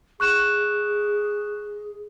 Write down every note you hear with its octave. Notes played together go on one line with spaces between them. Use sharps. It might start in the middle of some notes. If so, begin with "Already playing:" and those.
G#4 C#6 F#6 E7